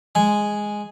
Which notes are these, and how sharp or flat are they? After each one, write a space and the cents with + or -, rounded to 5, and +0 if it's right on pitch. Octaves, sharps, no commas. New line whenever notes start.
G#3 +0 G#5 +0